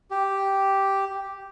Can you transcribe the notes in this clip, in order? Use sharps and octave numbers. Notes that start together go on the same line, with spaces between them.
G4